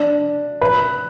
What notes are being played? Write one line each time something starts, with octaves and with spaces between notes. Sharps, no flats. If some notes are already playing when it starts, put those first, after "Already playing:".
Already playing: D4
B4